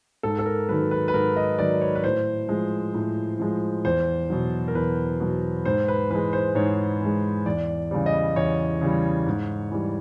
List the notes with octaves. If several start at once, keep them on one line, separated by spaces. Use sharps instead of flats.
G#2 A4
A4
A#4
D#3 F#3 B4
B4
B4
G#2 A#4
D#5
D#3 F#3 D5
C#5
B4
A2 C5
F3 G#3
A2
F3 G#3
E2 C5
B2 F#3
A#4
E2 B4
B2 F#3
G#2 C5
B4
E3 G#3 B4
C5
G#2 C#5
E3 G#3
E2 D5
C#3 E3 G3
D#5
E2 C#5
C#3 E3 G3
G#2
E3 G3